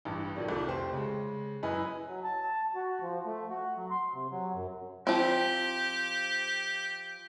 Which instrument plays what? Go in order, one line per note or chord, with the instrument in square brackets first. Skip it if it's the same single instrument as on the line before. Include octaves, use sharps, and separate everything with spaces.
[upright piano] A1 G2
D#3 F3 F#3 C#4 D4
C2 A3 D6
F1 G4 C5
C#3 G#3
F#2 E4 B4 D#5 G#5
[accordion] F#3
A5
F#4
F3
A3
F#4
F#3
C6
C3
F#3
F#2
[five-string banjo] F3 C4 [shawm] G4